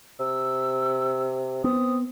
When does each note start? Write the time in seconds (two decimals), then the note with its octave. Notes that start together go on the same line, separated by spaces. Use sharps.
0.20 C3 E6
1.64 B3 C4 D#6